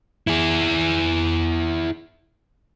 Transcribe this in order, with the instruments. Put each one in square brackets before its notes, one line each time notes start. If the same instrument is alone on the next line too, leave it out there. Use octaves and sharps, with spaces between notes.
[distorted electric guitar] E4 G#4